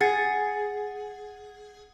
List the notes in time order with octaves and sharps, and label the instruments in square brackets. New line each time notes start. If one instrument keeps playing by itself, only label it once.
[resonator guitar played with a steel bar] G#4 [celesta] F#5 A6 C#7